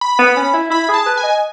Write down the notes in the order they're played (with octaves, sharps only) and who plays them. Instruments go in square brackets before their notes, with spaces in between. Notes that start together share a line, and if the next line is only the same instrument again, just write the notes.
[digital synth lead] B5
[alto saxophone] B3
C#4
E4
[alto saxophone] E4 [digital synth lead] B5
[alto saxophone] G#4 [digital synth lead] A5
[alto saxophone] B4
[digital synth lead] G#5
[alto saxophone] D#5